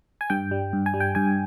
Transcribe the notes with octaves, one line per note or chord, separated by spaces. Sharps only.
G#5
G2 G5
G3
G2
G#5
G3
G5
G2 G#5